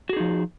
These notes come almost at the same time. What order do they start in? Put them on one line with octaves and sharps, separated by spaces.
F#4 G#4 D#4 F3